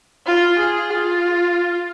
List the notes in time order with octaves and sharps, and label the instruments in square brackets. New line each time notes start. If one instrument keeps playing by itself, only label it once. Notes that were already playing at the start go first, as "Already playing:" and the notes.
[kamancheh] F4
G#4
F4